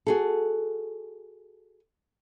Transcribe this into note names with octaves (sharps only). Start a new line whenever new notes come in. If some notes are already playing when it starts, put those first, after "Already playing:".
F#4 G#4 A4